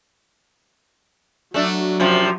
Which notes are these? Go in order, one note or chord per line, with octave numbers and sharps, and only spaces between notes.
F#3 A3 D4 F#4
F#2 C3 F3